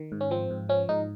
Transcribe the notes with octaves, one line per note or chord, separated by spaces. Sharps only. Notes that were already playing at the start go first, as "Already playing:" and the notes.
Already playing: D#3
G#2
C#4
F3 C4
G#2
F3 C#4
G#2 D#4